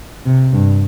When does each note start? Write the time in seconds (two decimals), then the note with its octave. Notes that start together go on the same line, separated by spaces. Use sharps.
0.25 C3
0.53 G2